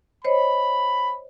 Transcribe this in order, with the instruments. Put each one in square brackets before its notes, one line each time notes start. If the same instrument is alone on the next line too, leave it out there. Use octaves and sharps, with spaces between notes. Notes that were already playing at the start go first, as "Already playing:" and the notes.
[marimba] C5 C#5 D#5 [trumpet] B5